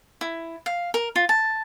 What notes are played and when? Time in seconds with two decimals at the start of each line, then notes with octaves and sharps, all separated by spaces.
0.21 E4
0.66 F5
0.94 A#4
1.16 F4
1.29 A5